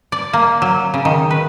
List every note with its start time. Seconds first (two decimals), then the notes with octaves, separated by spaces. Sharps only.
0.12 D5
0.33 A#3
0.62 F#3
0.94 C#3
1.05 D#3
1.31 B4